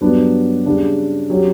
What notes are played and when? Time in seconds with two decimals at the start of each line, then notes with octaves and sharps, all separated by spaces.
0.01 G2 F#3 B3 D4
0.66 C#3 G3 D4
1.30 F#3 C#4 G4